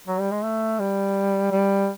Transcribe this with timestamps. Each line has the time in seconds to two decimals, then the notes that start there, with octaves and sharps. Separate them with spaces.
0.07 F#3
0.20 G3
0.31 G#3
0.44 A3
0.80 G3
1.52 G3